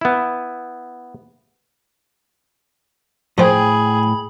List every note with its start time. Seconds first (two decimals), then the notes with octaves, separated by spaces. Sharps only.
0.01 B3 E4
3.38 A2 F3 G#4 C5 G5 B5